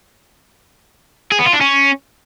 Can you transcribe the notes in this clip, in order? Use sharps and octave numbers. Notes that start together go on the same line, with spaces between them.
G#4
B3
F4
D4
C#4